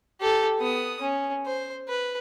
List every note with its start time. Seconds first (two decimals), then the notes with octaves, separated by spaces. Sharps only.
0.21 G4 A4
0.59 B3 D#6
1.01 C#4
1.46 C5
1.89 B4